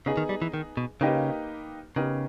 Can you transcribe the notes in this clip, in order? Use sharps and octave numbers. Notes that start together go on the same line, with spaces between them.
C#3 B3 D#4 G#4 D#5
D#3
G3
E3
D#3
B2
C#3 A#3 D#4 G4 B4 D#5
C#3 B3 D#4 G4 A#4 D#5